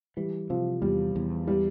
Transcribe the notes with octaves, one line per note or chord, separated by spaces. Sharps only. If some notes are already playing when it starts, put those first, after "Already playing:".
E3 G3
C3 F3
E2 G3
E2
E3 G3